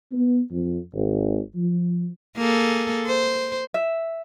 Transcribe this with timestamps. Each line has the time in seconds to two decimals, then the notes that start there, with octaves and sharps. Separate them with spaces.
0.12 B3
0.51 F2
0.94 G#1
1.56 F3
2.37 A#3 G#4 A4
3.06 C5
3.74 E5